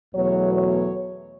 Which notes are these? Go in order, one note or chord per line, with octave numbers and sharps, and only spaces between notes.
E2 B2 F#3 A3 C#5
C#5